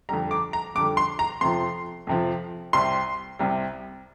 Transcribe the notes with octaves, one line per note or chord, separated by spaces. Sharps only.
F2 D3 G3 A#5
D6
A#5
F2 D3 G3 D6
C6
A#5
F2 C3 F3 C6
F2 C3 F3
C2 C3 G3 C6
C2 C3 G3